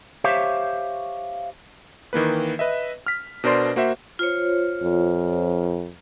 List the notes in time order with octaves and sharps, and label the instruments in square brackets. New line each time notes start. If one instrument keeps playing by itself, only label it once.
[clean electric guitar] G4 C5 C#5 E5 F5
[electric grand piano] D#3 E3 A#3 B4
B4 D#5 E5
F6 B6
B2 D4 A#4 C5 D5 C6
A#3 F#4 C5 E5
[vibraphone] F4 C5 C#5
[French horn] F2